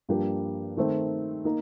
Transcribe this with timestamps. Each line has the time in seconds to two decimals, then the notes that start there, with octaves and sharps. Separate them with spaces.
0.09 G2 F3 A#3 D4 G4
0.77 D#3 A3 C4
1.45 A#3 D#4